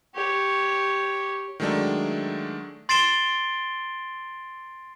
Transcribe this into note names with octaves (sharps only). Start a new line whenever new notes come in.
G4 C#5
D#3 F#3 G#3 A3 D4
C6 A6 C7 D7 E7 G7